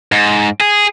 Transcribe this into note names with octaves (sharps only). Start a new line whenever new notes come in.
G#2
G#4